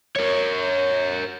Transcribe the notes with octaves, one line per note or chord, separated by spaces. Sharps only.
A#4 C#5